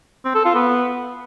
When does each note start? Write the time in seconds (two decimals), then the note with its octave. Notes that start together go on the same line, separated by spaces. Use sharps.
0.25 C4
0.35 A4
0.45 F4
0.55 B3